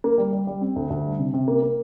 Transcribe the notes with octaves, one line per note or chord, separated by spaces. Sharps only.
A#3
G3
G3
G3
C4
D2
D2
G3
C3
C3
A#3
A#3